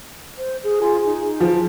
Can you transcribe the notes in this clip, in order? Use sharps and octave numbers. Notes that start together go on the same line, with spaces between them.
C5
G#4
F4 G#4 G#5
D#4
F3